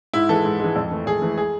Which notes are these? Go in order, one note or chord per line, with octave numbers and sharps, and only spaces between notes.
G#2 E4
E3 G#3 A4
G#2
E3 G#3
F2
E3 A3
F2 G#4
E3 A3
G#4